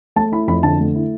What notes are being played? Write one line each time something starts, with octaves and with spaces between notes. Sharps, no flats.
A3 A5
E4 B5
F2 B5
D3 A5
A3
E4